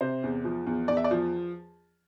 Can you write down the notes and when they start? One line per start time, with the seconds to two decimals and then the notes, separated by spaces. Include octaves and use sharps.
0.01 C3 C5
0.23 E2
0.45 F3
0.67 E2
0.88 E2 D5
0.97 E5
1.04 D5
1.11 F3